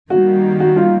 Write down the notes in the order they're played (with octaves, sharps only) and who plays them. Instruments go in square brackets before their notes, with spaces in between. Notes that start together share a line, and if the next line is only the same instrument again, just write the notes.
[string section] D#3 G3 A#3 [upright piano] F#4
[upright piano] F#4
F4